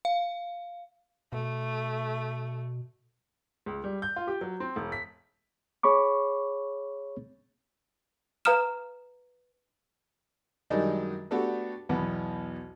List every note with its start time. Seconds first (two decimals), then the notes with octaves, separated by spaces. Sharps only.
0.05 F5
1.33 B2 A3
3.66 C#2
3.84 G3
4.02 G6
4.16 F4
4.27 G4
4.41 F#3
4.60 C4
4.76 E1
4.92 B6
5.83 G#4 C#5 B5 C#6 D6
8.45 B4 F5 A#5 D#6 F6 E7
10.70 F#2 D#3 G3 G#3 D4 D#4
11.31 A3 B3 D4 F#4 G4 A4
11.89 B1 E2 B3